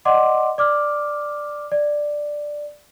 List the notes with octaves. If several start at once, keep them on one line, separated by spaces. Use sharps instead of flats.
D5 D#5 F#5 C6 D6
D5 D6 F6
D5